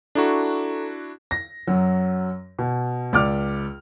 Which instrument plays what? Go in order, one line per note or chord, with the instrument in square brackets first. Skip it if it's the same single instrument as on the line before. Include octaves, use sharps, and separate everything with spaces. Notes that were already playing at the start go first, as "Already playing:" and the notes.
[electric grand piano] D4 E4 F#4 [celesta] A4 A#5 C#6
[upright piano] A#6
F#2 F#3
B2
C#2 D5 D6 F6